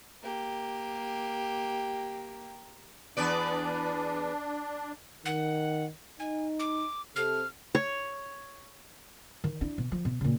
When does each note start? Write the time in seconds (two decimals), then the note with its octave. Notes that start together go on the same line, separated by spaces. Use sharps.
0.23 A#3 G4
3.17 E2 B3 D4 D5
5.25 D#3 F#5
6.20 D#4 G#5
6.59 D6
7.16 C3 A4 F6
7.75 C#5
9.44 D#3
9.61 D4 E4
9.78 B2
9.92 F3
10.05 B2
10.21 A#2 C#3